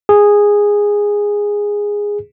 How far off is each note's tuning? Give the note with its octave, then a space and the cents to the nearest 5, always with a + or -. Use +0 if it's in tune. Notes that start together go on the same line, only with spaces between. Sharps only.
G#4 -10